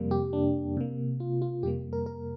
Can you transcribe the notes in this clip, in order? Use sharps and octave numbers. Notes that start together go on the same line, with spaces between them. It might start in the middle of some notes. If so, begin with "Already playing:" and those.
Already playing: F2 C3 G3 A#3
G4
D4
C3 A#3
F4
F4
F2 C3 G3 A#3 G4
A#4
A#4